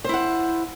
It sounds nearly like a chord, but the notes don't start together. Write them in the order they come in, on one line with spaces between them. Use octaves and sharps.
C5 E4 F#5